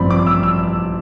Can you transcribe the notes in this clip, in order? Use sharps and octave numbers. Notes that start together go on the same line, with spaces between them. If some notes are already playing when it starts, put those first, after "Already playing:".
Already playing: A1 G2 F3 C4 D5 B5
D6
E6
E6